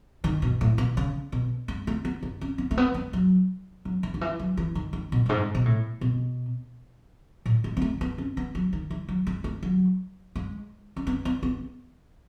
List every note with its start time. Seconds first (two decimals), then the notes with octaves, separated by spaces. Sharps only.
0.24 D#3
0.42 B2
0.61 A2
0.78 B2
0.97 C#3
1.32 B2
1.68 G#3
1.87 A3
2.05 B3
2.23 B3
2.41 C#4
2.58 B3
2.71 A3
2.77 B3
2.94 G#3
3.13 F#3
3.85 F#3
4.03 E3
4.14 D#3
4.21 E3
4.39 F#3
4.57 E3
4.75 D#3
4.93 D#3
5.12 B2
5.26 F#2
5.29 G#2
5.55 B2
5.66 A2
6.01 B2
7.46 A2
7.64 G#3
7.77 B3
7.82 A3
8.01 B3
8.18 C#4
8.37 B3
8.55 F#3
8.73 D#3
8.90 E3
9.09 F#3
9.27 G#3
9.44 A3
9.63 F#3
10.36 G#3
10.96 C#4
11.07 B3
11.25 B3
11.43 B3